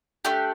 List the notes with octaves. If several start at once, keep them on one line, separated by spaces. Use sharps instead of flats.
A3 D4 G4